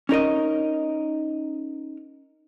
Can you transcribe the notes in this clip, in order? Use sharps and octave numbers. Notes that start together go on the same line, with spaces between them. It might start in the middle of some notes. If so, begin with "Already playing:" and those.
C#4 D#4 A#4 D#5